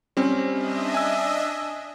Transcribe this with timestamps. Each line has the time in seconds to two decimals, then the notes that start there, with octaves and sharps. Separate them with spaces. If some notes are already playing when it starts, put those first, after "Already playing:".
0.17 G3 C4 C#4
0.50 D4 D#5 E5
0.94 G#5 E6